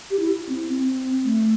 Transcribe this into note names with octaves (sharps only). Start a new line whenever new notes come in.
G4
E4
C4
C4
A3